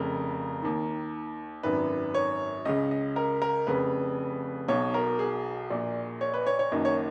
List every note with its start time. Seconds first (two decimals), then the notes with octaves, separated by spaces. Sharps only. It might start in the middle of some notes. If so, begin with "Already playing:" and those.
Already playing: F1 F2 C#3 A#4
0.62 D#2 D#3
1.63 G#1 F#2 D#3 B4
2.15 C#5
2.65 C#2 C#3 D#5
2.91 D#5
3.16 A#4
3.42 A#4
3.67 F1 F2 C#3 B4
4.68 B1 B2 C#5
4.94 A#4
5.19 G#4
5.70 A#1 A#2
6.21 C#5
6.34 B4
6.47 C#5
6.59 C#5
6.72 F#1 F#2 D#3 D#5
6.85 C#5